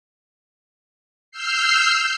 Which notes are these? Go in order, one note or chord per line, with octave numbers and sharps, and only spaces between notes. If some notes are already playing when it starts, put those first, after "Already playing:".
E6 F6 G6 C7